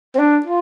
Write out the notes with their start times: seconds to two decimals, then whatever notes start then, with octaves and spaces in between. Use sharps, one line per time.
0.15 C4
0.19 D4
0.46 F4